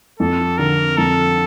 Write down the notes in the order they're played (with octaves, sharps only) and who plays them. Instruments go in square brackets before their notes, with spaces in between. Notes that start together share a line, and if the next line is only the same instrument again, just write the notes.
[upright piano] F2 [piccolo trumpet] A4
[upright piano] D3 [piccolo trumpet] A#4
[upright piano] F2 [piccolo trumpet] A4